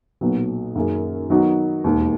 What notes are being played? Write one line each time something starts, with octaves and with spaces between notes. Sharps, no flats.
B1 A#2 F#3 B3
F#2 D#3 A#3 C#4 G#4
D#3 F#3 B3 D#4 F#4
E1 D#2 D#3